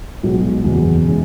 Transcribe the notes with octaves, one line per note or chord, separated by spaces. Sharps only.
B1 B2 G#3
F#1 E2 B2
E3 G#3 C#4